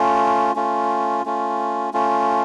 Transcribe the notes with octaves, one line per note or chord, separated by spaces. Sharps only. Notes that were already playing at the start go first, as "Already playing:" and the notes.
Already playing: A3 C#4 F4
A3 C#4 F4
A3 C#4 F4
A3 C#4 F4